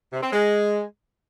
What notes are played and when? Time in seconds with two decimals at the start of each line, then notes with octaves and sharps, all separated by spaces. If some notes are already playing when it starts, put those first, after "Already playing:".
0.13 C3
0.23 C4
0.33 G#3